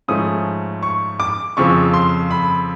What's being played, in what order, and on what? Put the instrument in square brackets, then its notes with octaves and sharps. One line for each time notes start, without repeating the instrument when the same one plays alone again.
[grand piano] G#2 F3 A3 C#4 D#6
C#6
D6
F2 C#3 F3 C#6
C6
B5